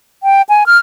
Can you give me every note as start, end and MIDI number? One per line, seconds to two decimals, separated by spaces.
0.23 0.42 79
0.49 0.66 80
0.66 0.78 89